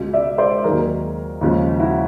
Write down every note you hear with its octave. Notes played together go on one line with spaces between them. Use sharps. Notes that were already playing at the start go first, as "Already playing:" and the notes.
Already playing: C#2 B2 G#3
D5 E5
C5 D5
D#2 D#3 F#3 G#4 A#4
D#2 C#3 F3 G#3
E4 F#4